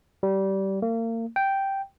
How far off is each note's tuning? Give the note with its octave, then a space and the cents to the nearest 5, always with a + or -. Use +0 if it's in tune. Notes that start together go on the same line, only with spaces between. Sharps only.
G3 -20
A#3 -35
G5 -5